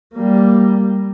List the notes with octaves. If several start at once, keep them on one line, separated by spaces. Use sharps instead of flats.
G3 A#3